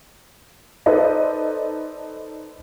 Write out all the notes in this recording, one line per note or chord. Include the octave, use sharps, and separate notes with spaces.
D#4 A4 B4 C5 D5 D#5